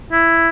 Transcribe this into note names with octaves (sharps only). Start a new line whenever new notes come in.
E4